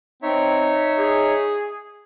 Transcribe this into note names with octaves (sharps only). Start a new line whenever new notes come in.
C4 D#4 C#5 E5
G#4